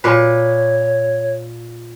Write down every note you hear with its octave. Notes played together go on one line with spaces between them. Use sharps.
A#2 B4 C#5